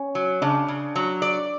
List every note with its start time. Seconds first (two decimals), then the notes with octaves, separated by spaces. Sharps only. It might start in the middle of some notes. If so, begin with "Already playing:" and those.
Already playing: C#4
0.15 F#3
0.42 C#3 D4
0.68 C#3
0.96 F#3
1.22 D5